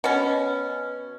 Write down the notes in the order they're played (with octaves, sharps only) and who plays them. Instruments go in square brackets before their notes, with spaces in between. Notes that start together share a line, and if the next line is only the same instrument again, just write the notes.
[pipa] B2 C#4